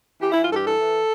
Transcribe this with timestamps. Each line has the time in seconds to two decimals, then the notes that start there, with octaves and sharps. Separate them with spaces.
0.21 E3 G4
0.32 E3 E4
0.42 F4
0.49 G2 G4 A4
0.64 E3 A4
0.79 E3